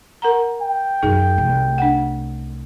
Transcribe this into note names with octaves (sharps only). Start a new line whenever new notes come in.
A#4 F#5 A#5
G5
F#2 D#3 D#4 G#4
C2 A3
D4 F#5